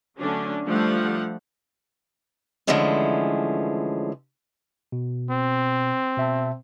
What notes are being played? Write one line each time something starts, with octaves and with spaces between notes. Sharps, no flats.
D3 F#3 A3 C#4 D4
F3 G3 A3 D4 F5 F#5
D3 E3 F3 G#3 A3 C#4
B2
C4
B2 E5 A5